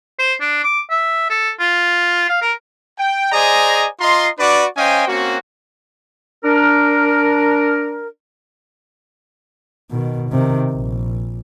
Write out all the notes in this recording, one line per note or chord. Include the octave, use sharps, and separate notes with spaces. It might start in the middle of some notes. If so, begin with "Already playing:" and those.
C5
D4
D6
E5
A4
F4
F5
A#4
G5
G#4 C5 D5 D#5 G#5 A#5
F4 D#5 A#5 C6
D4 F#4 B4 D5
C#4 C5 D#5 F5 G5 G#5
A#3 C4 C#4 F#4
D4 A#4
B2 D#3
C3 D#3
A#1